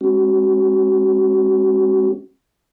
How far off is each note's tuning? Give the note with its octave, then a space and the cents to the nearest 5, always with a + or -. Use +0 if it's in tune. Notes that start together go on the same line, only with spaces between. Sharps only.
G#3 -10 C#4 -40 F#4 +25